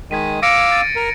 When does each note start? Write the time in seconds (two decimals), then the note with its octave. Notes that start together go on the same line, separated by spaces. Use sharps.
0.11 D#3 G#3 G#6 B6 D#7
0.43 F5 D6 E6 A#6 C#7 D7
0.72 A6 D#7
0.96 A#4